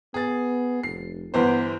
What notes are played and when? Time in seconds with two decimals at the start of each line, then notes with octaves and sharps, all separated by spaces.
0.14 B3 G#4 A6
0.83 F1 C7
1.34 G1 E3 B3 C5